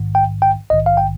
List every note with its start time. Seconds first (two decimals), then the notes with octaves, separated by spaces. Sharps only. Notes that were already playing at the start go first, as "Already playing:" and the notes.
Already playing: A#1 G#2 D#3
0.15 G5
0.42 G5
0.70 A#1 G#2 D#3 D#5
0.86 F5
0.97 G5